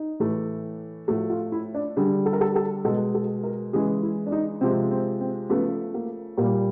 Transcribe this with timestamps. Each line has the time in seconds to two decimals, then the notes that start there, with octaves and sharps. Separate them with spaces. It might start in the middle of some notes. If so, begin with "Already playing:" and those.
Already playing: D#4
0.20 A2 E3 A3
1.08 A2 F3 A3 F#4
1.30 F4
1.52 E4
1.74 D4
1.97 D3 G3 G#4
2.26 A4
2.33 A#4
2.41 A4
2.56 A4
2.85 B2 G#3 A4
3.15 A4
3.44 A#4
3.73 C#3 E3 G#3 G#4
4.02 E4
4.26 D4
4.32 D#4
4.61 C3 F3 G#3 C4
4.91 C4
5.21 C4
5.49 C#3 F3 A3 B3
5.94 A#3
6.37 A#2 A#3
6.42 G3